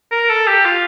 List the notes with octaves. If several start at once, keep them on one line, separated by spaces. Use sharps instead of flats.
A#4
A4
G4
F4